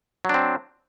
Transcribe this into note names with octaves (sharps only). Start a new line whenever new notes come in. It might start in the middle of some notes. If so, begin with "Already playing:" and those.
F#3 C4 D4